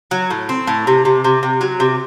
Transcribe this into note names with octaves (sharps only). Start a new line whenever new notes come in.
F#3
A2
C4
A2
C3
C3
C3
C3
F#3
C3